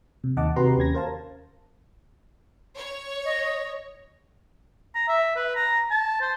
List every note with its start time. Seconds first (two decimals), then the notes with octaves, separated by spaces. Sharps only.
0.24 C3
0.36 D#2 D#3 D#5 F#5 A5 D6
0.56 C3 F#4 G4 B4 A#5 C6
0.77 D#2 C#4 G#6 A#6
0.95 A#4 C5 F5 A5
2.76 C#5
3.25 D#5
4.95 A#5
5.08 E5
5.36 B4
5.56 A#5
5.90 A5
6.21 C5